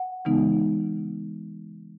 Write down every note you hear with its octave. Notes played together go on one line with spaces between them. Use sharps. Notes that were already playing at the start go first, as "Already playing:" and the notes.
Already playing: F#5
C#3 E3 G#3 B3 D#4